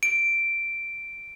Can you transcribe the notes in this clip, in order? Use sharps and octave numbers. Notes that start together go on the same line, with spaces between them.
D7